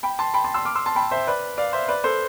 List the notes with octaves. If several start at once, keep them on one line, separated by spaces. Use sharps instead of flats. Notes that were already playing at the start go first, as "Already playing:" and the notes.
G5 B5
A5 C6
G5 B5
A5 C6
C6 E6
D6 F6
C6 E6
A5 C6
G5 B5
C5 E5
B4 D5
D5 F5
C5 E5
B4 D5
A4 C5